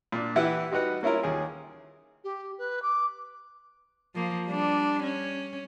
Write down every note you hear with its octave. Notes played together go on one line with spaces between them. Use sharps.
A#2 D4
E3 E4 G4 B4 F#5 E6
G3 D#4 F#4 B4 F#5
A#3 C#4 E4 F4 A#4
D#2 C#4 G#4
G4
B4
D6
F3 A#3
G3 D4
C#4